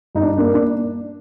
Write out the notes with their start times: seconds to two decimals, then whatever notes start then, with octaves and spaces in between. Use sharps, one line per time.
0.15 G2 D#4
0.23 D4
0.38 A#3 D4
0.54 D4